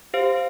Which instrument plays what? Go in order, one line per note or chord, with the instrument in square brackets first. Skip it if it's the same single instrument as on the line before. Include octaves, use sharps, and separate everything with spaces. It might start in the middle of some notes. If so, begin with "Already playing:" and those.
[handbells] G4 C5 F5